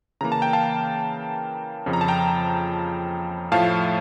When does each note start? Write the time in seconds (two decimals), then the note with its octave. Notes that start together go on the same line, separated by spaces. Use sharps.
0.21 C#3 E3 A#3 A#5
0.32 A5
0.42 G5
0.53 F5 A5
1.86 F2 C#3 F3
1.93 A#5
2.01 A5
2.08 G5 A#5
3.52 A2 F3 A3 F5 A5